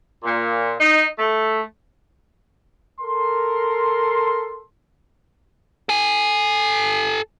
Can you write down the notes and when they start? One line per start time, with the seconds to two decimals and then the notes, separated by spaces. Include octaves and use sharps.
0.23 A#2
0.79 D#4
1.19 A3
3.01 A4 A#4 C6
5.89 A4 G#5